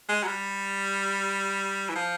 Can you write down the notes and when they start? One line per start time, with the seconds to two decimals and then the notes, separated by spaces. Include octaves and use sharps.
0.09 G#3
0.23 F#3
0.28 G3
1.89 E3
1.96 F3